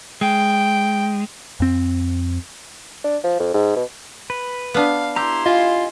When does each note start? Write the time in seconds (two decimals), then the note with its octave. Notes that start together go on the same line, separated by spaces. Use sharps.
0.21 G#3 G5
1.60 F2 C4
3.04 D4
3.24 F3
3.39 F2
3.54 G#2
3.76 B2
4.30 B4
4.74 B3 D4 F5
5.16 E4 G4 A#5 C6 E6
5.46 F4 D#5 F5 G#5